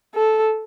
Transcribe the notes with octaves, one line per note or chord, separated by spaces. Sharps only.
A4